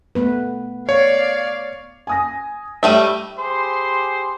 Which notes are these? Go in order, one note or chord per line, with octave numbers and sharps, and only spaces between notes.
A3 B3 B4
C#5 D5 F5
G#5 D#6 A#6
G3 A3 C#5 E5 D#7
G4 G#4 C5 B5 C6